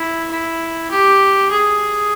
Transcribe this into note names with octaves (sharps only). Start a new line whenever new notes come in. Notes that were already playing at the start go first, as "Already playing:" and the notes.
Already playing: E4
E4
G4
G#4